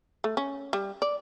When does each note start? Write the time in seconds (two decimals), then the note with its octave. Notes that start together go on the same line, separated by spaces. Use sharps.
0.24 A3
0.37 C#4
0.73 G3
1.02 D5